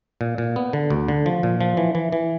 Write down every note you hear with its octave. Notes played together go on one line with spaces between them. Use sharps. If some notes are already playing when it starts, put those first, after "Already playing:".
A#2
A#2
B3
D3
D2
D3
F3
A#2
F3
E3
E3
E3